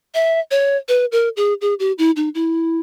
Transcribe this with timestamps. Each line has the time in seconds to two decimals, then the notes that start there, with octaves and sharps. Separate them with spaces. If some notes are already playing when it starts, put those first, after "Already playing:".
0.14 E5
0.51 C#5
0.88 B4
1.12 A#4
1.37 G#4
1.61 G#4
1.79 G4
1.98 E4
2.16 D#4
2.35 E4